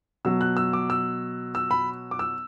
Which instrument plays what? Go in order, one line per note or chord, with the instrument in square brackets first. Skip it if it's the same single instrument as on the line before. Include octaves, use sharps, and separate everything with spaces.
[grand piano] B2 F#3 E6
F#6
E6
D6
E6
E6
B5
D6
E6